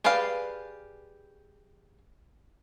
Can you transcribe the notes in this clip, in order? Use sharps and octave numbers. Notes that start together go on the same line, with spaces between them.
G4 G#4 B4 D5 F5